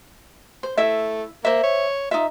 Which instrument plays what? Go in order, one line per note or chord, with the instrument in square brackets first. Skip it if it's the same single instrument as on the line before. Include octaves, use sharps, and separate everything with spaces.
[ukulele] C5
[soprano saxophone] A3 [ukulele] E4 E5
[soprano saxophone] A#3 [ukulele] C5 E5
[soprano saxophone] C#5
[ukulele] D#4 E5 [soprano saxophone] F4